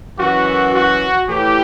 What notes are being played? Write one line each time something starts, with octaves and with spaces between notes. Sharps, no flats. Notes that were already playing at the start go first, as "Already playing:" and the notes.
F#2 E3 F#4
F#4
A2 E3 G4